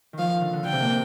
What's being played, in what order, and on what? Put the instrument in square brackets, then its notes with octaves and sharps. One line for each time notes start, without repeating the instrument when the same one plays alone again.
[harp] D#3
[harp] F3 [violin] F5
[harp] D#3
D3
D3
[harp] D3 [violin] G5
[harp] C3
A#2
C3